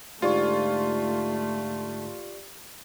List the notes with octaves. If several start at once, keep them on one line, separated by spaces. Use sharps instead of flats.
G#2 D3 A3 F4 G4 D5 C#6